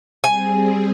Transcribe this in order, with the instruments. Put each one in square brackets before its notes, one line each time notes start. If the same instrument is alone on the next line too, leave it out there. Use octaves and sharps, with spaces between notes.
[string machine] G3 C4 G#4 [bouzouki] G#5